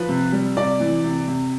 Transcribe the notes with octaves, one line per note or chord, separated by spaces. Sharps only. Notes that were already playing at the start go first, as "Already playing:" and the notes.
Already playing: F3 B4
C3
G3
C3 D5
E3
C3
C3